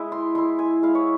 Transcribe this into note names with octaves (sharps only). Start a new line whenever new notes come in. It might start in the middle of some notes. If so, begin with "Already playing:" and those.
Already playing: G#3 E4
C6
G#3 E4 C6
G#5
G#3 E4 F5
C#5